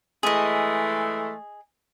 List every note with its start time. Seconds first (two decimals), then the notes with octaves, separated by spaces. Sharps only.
0.23 E3 G#3 A3 G#4 D#5